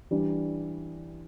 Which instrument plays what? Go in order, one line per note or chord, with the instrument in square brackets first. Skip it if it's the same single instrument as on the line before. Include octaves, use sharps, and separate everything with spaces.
[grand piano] E3 G3 D4